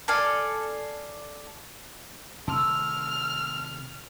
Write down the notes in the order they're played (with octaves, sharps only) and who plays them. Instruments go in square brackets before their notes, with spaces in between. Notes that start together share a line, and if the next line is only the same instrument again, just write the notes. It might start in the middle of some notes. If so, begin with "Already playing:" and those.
[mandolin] A4 D5 F5 G#5
[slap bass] C3 D#3 A3 [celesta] A5 C6 E6 [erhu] F6